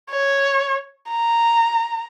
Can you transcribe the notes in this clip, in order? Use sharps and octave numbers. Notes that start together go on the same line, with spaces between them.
C#5
A#5